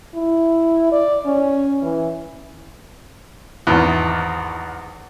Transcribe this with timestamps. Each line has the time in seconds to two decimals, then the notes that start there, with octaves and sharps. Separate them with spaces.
0.15 E4
0.92 D5
1.26 C#4
1.82 E3
3.67 G#1 E2